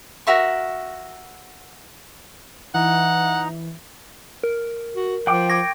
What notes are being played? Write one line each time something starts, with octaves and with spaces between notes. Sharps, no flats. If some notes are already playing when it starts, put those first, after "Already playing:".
F#4 A#4 E5 C#6
E3 D#4 F#5
A#4
F#4
F3 F#5 G5 D6
G5 C#6 D6 G#6 A#6